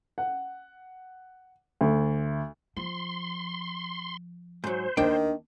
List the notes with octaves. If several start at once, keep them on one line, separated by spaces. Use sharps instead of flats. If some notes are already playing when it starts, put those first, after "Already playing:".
F#5
D2
F3 C6
G#2 F#3 C5
D#2 D#3 B3 D4 G5